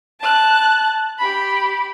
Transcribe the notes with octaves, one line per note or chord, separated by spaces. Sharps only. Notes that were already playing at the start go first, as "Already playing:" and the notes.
A5 F#6
G4 B5